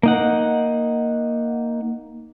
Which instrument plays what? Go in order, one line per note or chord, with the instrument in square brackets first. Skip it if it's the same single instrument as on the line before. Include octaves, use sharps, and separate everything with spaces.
[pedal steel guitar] A#3 D#4 F#5